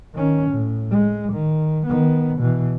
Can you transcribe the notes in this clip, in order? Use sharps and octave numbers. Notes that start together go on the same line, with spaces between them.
D#3 C#4
A2
G#3
D#3
D#3 B3
B2 E3